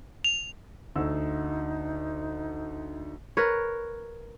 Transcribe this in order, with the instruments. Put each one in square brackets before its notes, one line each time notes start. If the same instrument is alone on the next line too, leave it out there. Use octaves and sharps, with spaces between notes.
[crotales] F7
[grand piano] D2 E6 [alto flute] D#4
[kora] A#4 B4 C#5